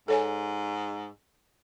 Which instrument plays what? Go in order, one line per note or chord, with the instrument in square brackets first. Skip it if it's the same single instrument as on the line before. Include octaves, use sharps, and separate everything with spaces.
[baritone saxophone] G#2 [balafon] A4 C#5 G#5